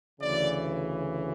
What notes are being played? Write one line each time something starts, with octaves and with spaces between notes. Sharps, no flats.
D2 C#3 E3 D5